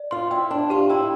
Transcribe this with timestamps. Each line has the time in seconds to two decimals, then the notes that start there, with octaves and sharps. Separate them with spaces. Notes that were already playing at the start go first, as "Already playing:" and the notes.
Already playing: D5
0.11 F4 C6
0.31 E4 G5
0.50 D4 C6
0.70 F4 G4
0.90 E4 G5